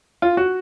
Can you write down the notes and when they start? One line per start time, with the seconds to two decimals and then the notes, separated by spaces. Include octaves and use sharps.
0.22 F4
0.37 F#4